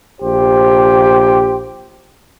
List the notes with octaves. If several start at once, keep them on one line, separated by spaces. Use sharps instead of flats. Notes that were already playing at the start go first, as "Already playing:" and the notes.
A#1 G4 C5